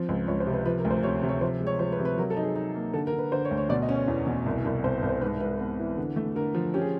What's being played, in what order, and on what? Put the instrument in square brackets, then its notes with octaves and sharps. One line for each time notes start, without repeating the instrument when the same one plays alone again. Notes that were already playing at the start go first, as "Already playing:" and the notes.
Already playing: [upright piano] F3 C4
C#2
C#2 C#5
C5
C3
B4
F3 B4
A#4
D2
C5
C3 C#5
C3
C#5
F3 C5
G#3
C#5
F3 C5
B4
C3
B4
F#3 A#4
A4
D#4
G#4
D#4
A#3
D3 A4
A#4
D3
B4
D3 C5
C#5
D2
C#5
B2 D5
D#5
C#4
C#5
E2
B2
C2
C2
C2 C5
B4
C2
C5
G#2 B4
G#2 B4
B3
E3
D3
A3
D3 A#4
F3
C#4 G4
G#4